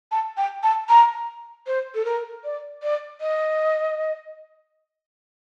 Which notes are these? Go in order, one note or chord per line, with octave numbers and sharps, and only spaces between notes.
A5
G5
A5
A#5
C5
A4
A#4
D5
D5
D#5